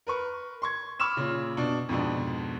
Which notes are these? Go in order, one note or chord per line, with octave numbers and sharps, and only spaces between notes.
A#4 B4 C#6
C6 C#6 G#6
B5 C#6 D6 E6 F6 E7
A#2 C#3
B2 D4
F2 G#2 B2 D4